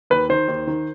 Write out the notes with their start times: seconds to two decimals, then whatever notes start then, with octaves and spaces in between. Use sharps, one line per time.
0.10 D#2 B4
0.29 D#3 C5
0.48 D#2
0.67 D#3